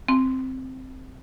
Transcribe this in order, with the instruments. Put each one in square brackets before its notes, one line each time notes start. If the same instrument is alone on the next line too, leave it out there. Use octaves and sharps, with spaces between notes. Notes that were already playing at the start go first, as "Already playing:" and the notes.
[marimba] C4